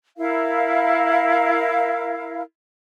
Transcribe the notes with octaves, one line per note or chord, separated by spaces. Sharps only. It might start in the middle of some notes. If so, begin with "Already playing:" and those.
E4 A#4 F5